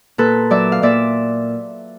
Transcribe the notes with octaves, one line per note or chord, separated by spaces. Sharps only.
A#2 A4 B4
F#3 D5 E5
F5
A#2 D5 E5